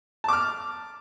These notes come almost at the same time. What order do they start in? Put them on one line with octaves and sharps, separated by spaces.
A5 D6 F6